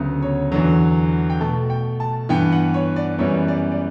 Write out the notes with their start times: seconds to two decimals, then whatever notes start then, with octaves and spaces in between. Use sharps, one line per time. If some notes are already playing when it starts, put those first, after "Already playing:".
Already playing: D2 C#3 F#3 B3
0.22 C#5
0.52 E2 D3 F#3
1.30 G5
1.40 B2 A3 A5
1.70 G5
2.00 A5
2.29 G2 E3 B3 G5
2.52 F#5
2.74 C#5
2.96 D5
3.18 F#2 E3 G3 B3 C#5
3.48 D5
3.72 D5